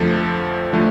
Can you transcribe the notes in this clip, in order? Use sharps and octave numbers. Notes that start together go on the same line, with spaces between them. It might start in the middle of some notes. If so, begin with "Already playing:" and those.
Already playing: F2 D3 F3 A3 A4
D3 F3 A3